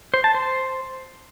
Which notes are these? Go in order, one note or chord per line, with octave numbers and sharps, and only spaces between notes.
C5
A5
C5